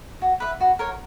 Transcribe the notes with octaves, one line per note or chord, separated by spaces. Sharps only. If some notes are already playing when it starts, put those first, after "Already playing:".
F#4
B4 E5
F#4
A#4 C#5